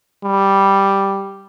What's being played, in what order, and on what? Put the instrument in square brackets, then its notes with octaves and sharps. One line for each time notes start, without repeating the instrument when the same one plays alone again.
[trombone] G3